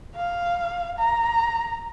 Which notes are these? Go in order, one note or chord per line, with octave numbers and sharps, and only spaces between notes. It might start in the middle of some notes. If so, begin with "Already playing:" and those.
F5
A#5